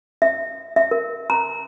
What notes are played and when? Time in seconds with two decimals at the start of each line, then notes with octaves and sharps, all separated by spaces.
0.22 E5
0.76 E5
0.91 A#4
1.30 A#5